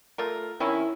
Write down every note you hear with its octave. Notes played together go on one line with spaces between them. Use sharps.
A3 F4 A#4
C3 D#3 C#4 E4